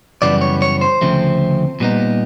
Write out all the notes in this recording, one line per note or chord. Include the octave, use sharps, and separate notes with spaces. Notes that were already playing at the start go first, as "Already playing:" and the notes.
F#2 C#3 E3 G3 B3 D5
C#5
C#5
C5
D2 C#3 F3 A3 C4
A#2 G3 B3 D#4